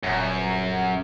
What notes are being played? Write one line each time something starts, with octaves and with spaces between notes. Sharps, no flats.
D#1 F#2